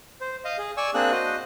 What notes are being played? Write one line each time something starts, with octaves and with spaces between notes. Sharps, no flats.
C5
D#5 F5
G#4
D5 G#5 C#6 E6
A#3 C4 D4 G#4 F#6
F#4 C5 D#5